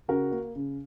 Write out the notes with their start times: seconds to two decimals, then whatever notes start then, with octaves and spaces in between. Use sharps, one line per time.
0.08 C#3 F#4 A#4
0.32 A#3
0.55 C#3